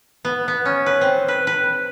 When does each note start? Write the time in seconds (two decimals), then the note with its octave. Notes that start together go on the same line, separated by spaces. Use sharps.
0.25 B3
0.48 B3
0.65 C#4
0.86 B4
1.01 C4
1.28 B4
1.47 B4